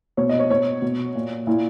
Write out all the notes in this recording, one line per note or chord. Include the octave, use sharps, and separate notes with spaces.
B2 C#5
D#5
C#5
B2 C#5
B2
A#2
A#2 E4